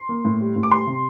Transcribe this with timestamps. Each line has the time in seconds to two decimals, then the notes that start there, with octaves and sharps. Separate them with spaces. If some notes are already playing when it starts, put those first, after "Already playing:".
Already playing: C6
0.09 A#3
0.25 A2
0.41 G3
0.56 A2
0.63 D6
0.71 G3 C6
0.87 C3